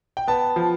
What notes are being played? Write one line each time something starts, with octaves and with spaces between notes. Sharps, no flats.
G5
B3 A5
F3